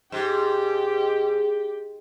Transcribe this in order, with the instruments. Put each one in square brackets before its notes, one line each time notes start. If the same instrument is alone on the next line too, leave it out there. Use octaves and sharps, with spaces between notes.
[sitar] G#2 [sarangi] G4